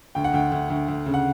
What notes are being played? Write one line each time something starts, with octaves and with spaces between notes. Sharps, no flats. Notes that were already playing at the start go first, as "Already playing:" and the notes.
D2 G5
F#5
D2 G5
D2
D2
D2
C#3
F#5